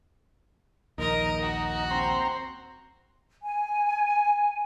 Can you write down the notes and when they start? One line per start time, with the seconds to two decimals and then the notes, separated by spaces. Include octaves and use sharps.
0.98 A#1 D#2 D#4 A#4 D#5
1.41 F#4
1.91 C4 A#5 C6
3.44 G#5